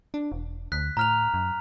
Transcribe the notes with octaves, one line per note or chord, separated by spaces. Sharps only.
D4
E1
D2 F#6 B6
A2 A#5 F6 F7
F#2